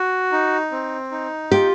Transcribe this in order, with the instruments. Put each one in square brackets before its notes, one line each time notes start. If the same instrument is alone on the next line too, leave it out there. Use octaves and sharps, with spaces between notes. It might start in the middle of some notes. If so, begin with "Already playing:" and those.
Already playing: [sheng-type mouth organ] F#4
D#4
C4
D#4
[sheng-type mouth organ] F4 [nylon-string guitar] G4